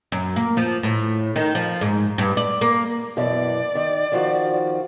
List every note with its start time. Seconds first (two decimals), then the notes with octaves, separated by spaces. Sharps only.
0.12 F#2
0.36 A#3
0.57 F3
0.83 A2
1.36 D#3
1.55 F3
1.81 G#2
2.18 G2
2.37 D5
2.61 A#3
3.17 F#2 B2 E3 D5
3.75 D#3
4.12 D#3 F3 F#4